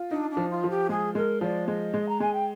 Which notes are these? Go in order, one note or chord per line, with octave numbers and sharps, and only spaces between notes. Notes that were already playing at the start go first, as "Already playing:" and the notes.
Already playing: F4
D4 D#4
D4
F3
F4
F3
G4
G#3 G#4
G#3 A#4
F3 D5
G#3 D#5
G#3
A#5
G#3 G#5
G5